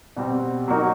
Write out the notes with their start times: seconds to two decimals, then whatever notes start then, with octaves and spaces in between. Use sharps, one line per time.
0.17 B2 G3 C4
0.68 F#3 A#3 D#4 F#4